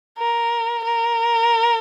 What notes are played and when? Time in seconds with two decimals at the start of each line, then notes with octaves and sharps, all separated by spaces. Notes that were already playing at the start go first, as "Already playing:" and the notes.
0.18 A#4
0.84 A#4